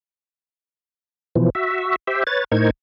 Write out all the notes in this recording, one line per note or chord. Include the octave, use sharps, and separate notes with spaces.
B2 E3 F3
F#4 E5
G4 C5 E5
B4 C#5 A6
A2 D#4 A#4 C5 C#6 G#6